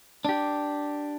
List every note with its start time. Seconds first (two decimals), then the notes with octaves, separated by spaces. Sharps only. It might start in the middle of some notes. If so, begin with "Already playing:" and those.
0.25 D4 G4